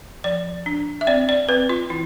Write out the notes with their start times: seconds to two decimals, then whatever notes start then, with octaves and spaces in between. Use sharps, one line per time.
0.24 F3 D5
0.66 D4
1.01 E5
1.07 C4 D5
1.29 D5
1.49 C4 B4
1.69 F4
1.90 E3 E4